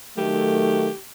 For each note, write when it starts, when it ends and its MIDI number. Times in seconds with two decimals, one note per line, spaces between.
0.18 0.89 51
0.18 0.89 54
0.18 0.89 57
0.18 0.98 67